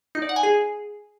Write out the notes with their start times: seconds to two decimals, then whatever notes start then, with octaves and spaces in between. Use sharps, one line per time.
0.15 D#4
0.22 D5
0.29 F#5
0.36 G#5
0.43 G#4